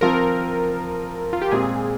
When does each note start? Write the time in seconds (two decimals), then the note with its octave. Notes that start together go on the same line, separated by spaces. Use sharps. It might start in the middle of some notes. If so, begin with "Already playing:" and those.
0.01 F3 C4 F4 A#4
1.33 F4
1.42 G4
1.51 A#2 G#3 C4 F4 G#4